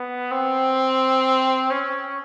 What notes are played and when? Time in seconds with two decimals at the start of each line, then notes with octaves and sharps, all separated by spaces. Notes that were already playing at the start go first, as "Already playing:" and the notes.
Already playing: B3
0.31 C4
1.71 C#4